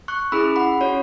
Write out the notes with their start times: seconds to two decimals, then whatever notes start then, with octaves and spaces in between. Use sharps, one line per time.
0.08 C#6 F#6
0.32 C#4 E4 G#4 B5 E6
0.56 F#5 B5
0.81 C#4 F#4 C#5